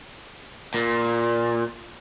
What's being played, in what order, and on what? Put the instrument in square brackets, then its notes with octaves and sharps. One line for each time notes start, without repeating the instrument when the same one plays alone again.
[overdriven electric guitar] A#2